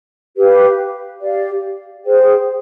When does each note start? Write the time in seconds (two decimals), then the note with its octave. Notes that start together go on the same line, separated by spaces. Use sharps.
0.37 G4 B4 F5
1.21 G4 D5 F5
2.04 G#4 C5 G5